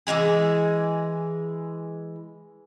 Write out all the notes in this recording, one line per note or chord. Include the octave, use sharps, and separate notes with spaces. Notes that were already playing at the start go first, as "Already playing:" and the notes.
E3 F3 G#3 G#4